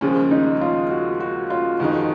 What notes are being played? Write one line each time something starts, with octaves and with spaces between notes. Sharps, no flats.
D#2 C#3 F3 G#3 C#4
D#4
F4
F#4
F#4
F4
F2 D#3 G#3 D#4 F#4